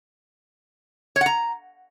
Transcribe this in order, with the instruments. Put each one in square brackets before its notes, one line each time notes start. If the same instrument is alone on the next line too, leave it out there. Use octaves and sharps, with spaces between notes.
[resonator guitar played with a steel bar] C#5
F#5
A#5